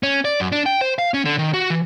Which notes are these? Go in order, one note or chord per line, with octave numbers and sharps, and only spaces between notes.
C#4
D5
F#2
D4
G5
C5
F5
C#4
D3
D#3
F#4
E3